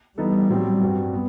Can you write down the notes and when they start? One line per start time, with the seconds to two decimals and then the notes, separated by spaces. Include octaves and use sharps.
0.18 E3 G3 B3 D#4 A4
0.50 A2 F#3 C4
0.81 G2 F#3 C4 F#4
1.13 B3